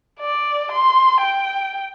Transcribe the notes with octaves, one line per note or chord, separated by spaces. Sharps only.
D5
C6
G5